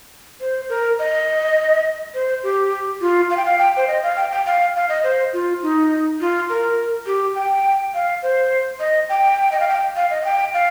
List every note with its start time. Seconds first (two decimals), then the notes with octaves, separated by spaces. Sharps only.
0.41 C5
0.69 A#4
0.99 D#5
2.14 C5
2.43 G4
3.01 F4
3.30 F5
3.37 G5
3.45 F5
3.59 G5
3.77 C5
3.87 D#5
4.03 F5
4.16 G5
4.31 G5
4.46 F5
4.76 F5
4.89 D#5
5.04 C5
5.33 F4
5.62 D#4
6.20 F4
6.49 A#4
7.06 G4
7.35 G5
7.94 F5
8.23 C5
8.80 D#5
9.09 G5
9.52 D#5
9.60 F5
9.68 G5
9.96 F5
10.10 D#5
10.21 F5
10.25 G5
10.54 F5